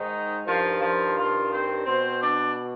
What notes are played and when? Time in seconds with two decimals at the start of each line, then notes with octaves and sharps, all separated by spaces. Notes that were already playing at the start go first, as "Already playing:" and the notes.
Already playing: G#2 D#3 D#4
0.46 G2 D#3 F3 F4
0.81 F3 F4
1.17 F3 F4
1.52 C4 C5
1.86 B2 C4 C5
2.21 D4 D5